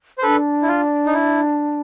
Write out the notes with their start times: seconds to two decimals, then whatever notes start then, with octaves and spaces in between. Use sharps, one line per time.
0.18 C5
0.23 D4 A4 B4
0.62 E4
0.68 F4
1.06 D#4
1.13 E4